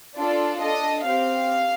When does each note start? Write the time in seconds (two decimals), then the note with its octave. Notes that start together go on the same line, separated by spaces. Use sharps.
0.17 D4 F4 A4 D5
0.61 D4 A4 D#5
1.06 C4 G4 F5